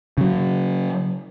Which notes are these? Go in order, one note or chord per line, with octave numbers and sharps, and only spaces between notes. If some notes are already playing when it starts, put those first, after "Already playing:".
C#3 F#3